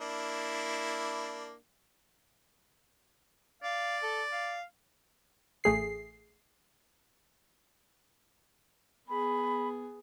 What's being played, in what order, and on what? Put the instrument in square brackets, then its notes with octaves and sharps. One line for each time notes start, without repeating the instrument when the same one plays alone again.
[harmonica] A#3 D4 E4
[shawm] D5 [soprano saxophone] F5
[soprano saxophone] A4
F5
[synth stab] A1 A3 G#4 C7
[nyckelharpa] B3 G#4 [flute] B5